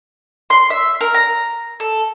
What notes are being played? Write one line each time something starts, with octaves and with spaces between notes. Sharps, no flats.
C6
E5
A#4
A#5
A4